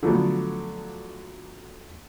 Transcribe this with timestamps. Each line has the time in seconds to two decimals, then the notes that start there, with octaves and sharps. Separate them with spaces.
0.03 D3 F3 F#3 A3 B3